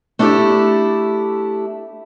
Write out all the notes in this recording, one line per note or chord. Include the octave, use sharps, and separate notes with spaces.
A3 D4 E4 G4 A4